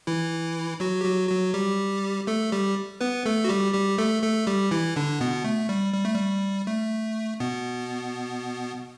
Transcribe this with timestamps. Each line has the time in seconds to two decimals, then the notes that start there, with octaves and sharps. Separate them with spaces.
0.07 E3 E4
0.80 F#3 F#4
1.01 G4
1.04 F#3 F#4
1.29 F#3 F#4
1.54 G3 G4
2.27 A3 A4
2.52 G3 G4
3.01 B3 B4
3.26 A3 A4
3.44 F#4
3.49 G3 G4
3.74 G3 G4
3.98 A3 A4
4.22 A3 A4
4.47 G3 G4
4.71 E3 E4
4.96 D3 D4
5.20 B2 B3
5.44 A3
5.69 G3
5.94 G3
6.05 A3
6.15 G3
6.67 A3
7.40 B2 B3